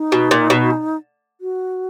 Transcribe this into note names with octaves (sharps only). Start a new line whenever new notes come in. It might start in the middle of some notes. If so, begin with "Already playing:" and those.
Already playing: D#4
B2
A#2
B2
F#4